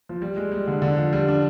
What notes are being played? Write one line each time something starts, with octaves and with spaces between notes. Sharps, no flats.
F3
G3
G#3
G3
D3
D3
F3
G3
D4